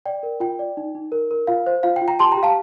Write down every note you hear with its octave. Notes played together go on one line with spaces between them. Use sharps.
D5 G5
A#4
F4 G5
D5
D#4
D#4
A#4
A#4
F4 F5
C5
F4 F5
G5
F4
G5 A#5
G4 A5 C6
G5 A#5
G4
F5 A5